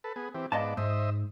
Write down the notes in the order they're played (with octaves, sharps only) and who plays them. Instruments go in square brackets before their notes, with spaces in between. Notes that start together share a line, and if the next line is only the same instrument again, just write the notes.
[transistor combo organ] A4 B4
B3 G#4
E3 C4 G4
[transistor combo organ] G#2 B3 D5 [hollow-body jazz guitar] D#5 F5 A5
[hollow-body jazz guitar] G#2 [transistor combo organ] C5 D#5 E5